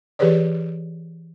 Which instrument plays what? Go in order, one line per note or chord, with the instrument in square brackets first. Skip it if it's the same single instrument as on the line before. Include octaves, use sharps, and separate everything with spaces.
[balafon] E3 G4 G#4 B4 C#5 D5